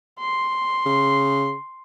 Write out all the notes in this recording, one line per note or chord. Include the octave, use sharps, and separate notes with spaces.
C6
C#3